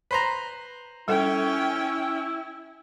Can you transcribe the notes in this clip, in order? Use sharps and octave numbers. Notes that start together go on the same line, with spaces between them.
B4 C5 A#5
G3 C#4 E4 A4 G5